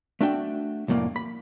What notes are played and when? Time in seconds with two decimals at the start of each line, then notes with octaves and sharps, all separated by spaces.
0.21 A3 D4 F#4 G5
0.88 C2 F2 A2 A#3 D5
1.16 B5